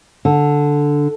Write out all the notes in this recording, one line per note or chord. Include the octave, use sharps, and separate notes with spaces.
D3